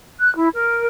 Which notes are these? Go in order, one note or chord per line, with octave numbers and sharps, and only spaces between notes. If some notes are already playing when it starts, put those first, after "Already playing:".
F#6
E4
A#4